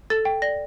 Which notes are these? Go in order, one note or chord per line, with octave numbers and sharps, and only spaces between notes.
A4 A6
G5
D5 A#6